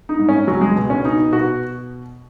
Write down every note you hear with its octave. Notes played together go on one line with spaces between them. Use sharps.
D#4
G#2
C#4
C#2 F#3
G#3
B2
C#4
B2 D#4
B2 F#4